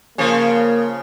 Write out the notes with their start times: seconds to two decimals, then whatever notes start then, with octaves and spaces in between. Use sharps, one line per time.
0.18 C#3 F3 A#3